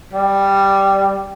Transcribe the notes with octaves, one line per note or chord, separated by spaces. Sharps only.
G3